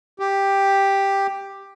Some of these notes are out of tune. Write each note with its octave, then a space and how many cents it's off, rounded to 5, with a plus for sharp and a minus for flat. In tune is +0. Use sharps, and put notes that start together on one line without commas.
G4 +5